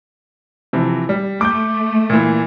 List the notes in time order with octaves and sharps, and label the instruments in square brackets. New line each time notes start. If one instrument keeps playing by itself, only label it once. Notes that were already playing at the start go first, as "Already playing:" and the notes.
[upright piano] C3 E3 F3
G3
[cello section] A3 [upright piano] D6 G6
[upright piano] A#2 E3